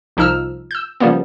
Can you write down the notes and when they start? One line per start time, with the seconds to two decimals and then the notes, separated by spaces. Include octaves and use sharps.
0.17 C2 F3 D#4 E6 F6
0.71 E6 G6
1.00 C#3 F3 G3 A#3 B3